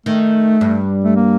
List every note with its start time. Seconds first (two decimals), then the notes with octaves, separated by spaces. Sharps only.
0.06 D#3 A3
0.61 G2
1.04 A3
1.16 A#3